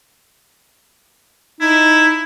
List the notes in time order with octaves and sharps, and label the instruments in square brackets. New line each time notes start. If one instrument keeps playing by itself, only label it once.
[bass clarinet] D#4 [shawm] E4